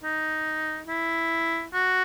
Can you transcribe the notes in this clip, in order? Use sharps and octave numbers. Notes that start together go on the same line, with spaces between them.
D#4
E4
F#4